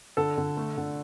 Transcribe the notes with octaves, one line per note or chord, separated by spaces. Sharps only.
D3 A4
D3
A3
D3